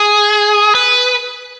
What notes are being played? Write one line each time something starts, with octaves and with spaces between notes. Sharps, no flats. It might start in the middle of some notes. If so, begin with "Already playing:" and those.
Already playing: G#4
B4